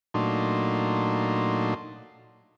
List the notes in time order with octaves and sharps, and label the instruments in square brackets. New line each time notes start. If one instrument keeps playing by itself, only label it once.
[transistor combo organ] A#2 F#3 A3 D4 D#4 C6